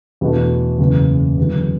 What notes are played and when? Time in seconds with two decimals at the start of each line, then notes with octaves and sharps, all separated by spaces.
0.21 E2 B2 A3 D4 F#4
0.79 F#1 E2 C#3
1.38 E2 D3 F#3